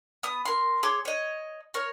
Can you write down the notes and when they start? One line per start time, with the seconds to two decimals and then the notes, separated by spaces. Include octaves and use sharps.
0.23 B3 D#6
0.45 A#4 C6
0.83 G#4 C#5 C6 D6
1.05 C#5 D#5
1.74 A#4 C#5